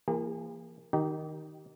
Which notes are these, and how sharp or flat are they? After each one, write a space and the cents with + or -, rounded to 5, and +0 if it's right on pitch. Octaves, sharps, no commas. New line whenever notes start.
E3 +30 A#3 +0 G#4 -45
D#3 +0 D#4 +0 G4 -30